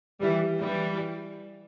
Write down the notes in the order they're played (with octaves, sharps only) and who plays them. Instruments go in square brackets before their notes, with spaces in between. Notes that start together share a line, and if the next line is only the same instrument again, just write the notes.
[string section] E3 G3
E3 G3